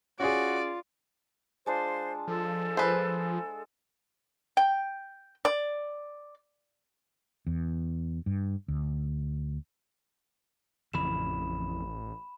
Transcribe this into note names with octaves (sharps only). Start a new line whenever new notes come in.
C#4 F4 F#4 G#4 D5
G#3 D4 F4 C5
F3 A4
G#3 B4 C5 C6 E6
G5
D5
E2
G2
D2
A1 F2 C#3 E3 B5 E7